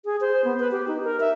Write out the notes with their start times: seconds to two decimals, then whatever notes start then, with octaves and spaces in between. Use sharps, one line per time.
0.05 G#4
0.21 C5
0.44 B3
0.60 B4
0.71 G4
0.88 D#4
1.04 A#4
1.20 E5